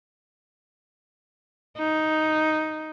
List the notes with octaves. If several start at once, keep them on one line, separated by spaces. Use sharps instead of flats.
D#4